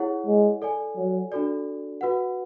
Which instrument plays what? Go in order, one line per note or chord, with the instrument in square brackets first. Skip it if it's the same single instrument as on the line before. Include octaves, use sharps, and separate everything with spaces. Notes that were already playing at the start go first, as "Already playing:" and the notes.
Already playing: [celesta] E4 G#4 C#5 F#5
[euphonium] G#3
[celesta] A4 D5 G#5
[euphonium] F#3
[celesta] D4 F#4 A4 D5
F#4 B4 F#5